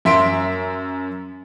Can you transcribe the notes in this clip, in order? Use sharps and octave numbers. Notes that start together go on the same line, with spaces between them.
F#2 E5 C6 D7